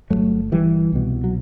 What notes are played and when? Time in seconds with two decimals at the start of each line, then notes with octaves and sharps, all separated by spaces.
0.10 F#2 F#3 A3
0.16 G1
0.52 E3 G3
0.92 C2 B2
1.24 F#3